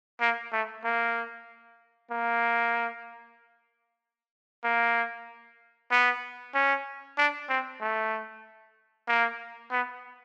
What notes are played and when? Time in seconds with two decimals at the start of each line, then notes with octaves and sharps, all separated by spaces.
0.21 A#3
0.52 A3
0.84 A#3
2.11 A#3
4.64 A#3
5.91 B3
6.55 C#4
7.18 D4
7.49 C4
7.81 A3
9.08 A#3
9.71 B3